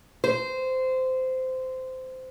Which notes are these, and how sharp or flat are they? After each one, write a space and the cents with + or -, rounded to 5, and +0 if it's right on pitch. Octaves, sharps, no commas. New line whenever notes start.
C5 -15